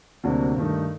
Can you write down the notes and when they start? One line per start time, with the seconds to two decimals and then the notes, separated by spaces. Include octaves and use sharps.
0.24 D2 C3 F#3 A#3 D4
0.56 G2 D#3 A3 D#4